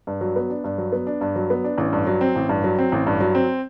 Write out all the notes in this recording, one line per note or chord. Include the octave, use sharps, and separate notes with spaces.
G2
F#3
B3
D4
G2
F#3
B3
D4
G2
F#3
B3
D4
A1
G2
F#3
C4
A1
G2
F#3
C4
A1
G2
F#3
C4